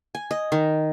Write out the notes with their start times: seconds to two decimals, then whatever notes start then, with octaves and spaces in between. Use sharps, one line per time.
0.15 G#5
0.31 D#5
0.52 D#3